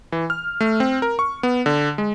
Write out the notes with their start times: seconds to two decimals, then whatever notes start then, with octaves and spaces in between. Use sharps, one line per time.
0.12 E3
0.30 F6
0.61 A3
0.80 C4
1.02 A#4
1.19 C#6
1.43 B3
1.66 D3
1.98 G#3